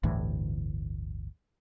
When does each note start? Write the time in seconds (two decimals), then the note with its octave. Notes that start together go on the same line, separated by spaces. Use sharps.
0.03 G1 D2 A2 E3